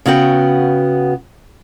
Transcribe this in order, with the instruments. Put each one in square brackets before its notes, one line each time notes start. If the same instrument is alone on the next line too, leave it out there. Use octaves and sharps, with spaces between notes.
[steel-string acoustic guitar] C#3 B3 F#4 G5